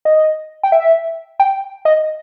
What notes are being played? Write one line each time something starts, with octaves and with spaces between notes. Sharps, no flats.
D#5
G5
E5
G5
D#5